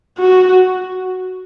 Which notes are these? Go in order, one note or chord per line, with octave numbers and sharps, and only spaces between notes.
F#4